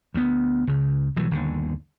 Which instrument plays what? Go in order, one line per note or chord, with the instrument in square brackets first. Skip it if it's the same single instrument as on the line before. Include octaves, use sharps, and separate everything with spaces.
[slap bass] D2 B3
C#2 C#3
B1 E3 F#3 G3
G1 D#2 D3